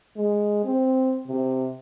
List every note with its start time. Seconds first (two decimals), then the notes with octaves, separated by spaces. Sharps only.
0.17 G#3
0.65 C4
1.28 C3